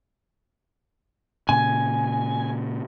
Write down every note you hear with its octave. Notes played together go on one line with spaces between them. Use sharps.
A#2 C#3 G#5